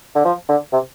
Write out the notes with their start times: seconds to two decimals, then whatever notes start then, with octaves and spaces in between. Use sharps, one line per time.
0.15 D3
0.25 F3
0.49 D3
0.73 C3